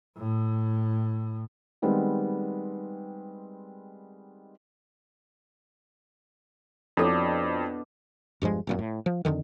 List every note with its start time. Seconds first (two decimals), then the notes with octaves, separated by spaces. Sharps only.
0.17 A2
1.82 D#3 G3 G#3 B3 C4
6.97 F2 B2 D4 E4 A4 C#5 D#5
8.42 E1 G2 F3 G#3
8.67 F1 F#2 A#2
8.79 A2
9.06 F3
9.25 F2 B2 D3 D#3